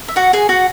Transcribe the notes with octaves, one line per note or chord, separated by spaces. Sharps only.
E5
F#4 F#5
G#4 G#5
F#4 F#5